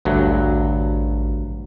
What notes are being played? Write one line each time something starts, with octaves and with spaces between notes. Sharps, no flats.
A1 D2 G2 F#3